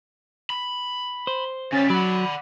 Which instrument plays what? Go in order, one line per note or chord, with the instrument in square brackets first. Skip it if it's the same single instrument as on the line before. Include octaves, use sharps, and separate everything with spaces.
[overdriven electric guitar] B5
[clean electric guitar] C5
[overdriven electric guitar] C#3 G3 [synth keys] C#4 A6 B6
[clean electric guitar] F#3 [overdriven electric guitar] D5 F#5 [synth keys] B5